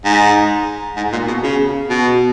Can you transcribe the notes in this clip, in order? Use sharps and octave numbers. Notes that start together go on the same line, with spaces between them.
G#2
G#2
A#2
B2
C#3
B2